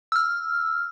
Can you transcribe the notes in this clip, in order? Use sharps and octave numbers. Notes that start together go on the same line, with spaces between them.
E6 F6